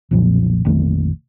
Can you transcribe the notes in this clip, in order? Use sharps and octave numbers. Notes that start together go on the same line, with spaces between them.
B1 F2 A#2 F3
A#1 F2 D#3 A3